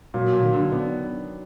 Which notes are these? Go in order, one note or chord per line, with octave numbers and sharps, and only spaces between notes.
A#2 F#3
A#2
D#3
D3
B3 D4